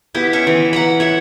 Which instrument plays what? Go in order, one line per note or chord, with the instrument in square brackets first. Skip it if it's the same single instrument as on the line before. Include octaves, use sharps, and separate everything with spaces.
[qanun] B3 E4 G4
C#4 E5 C#6
E3
F#5 A#5 B5
C#5 E5 F#5